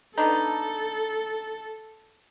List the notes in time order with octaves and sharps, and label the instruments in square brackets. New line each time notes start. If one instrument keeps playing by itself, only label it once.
[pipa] B3 D4 D#4 [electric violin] A4